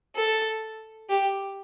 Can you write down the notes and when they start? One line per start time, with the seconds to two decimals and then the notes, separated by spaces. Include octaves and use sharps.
0.16 A4
1.09 G4